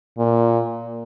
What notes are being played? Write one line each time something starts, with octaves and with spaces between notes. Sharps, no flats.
A#2